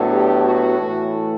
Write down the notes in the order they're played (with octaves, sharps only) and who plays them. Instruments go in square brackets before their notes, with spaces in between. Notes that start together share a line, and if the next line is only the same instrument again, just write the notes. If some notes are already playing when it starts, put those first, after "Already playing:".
Already playing: [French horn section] A2 F#3 B3 D4
G4
F#4
A2 E3 A3